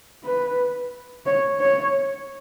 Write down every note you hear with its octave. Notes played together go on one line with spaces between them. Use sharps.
B4
C#5
C#5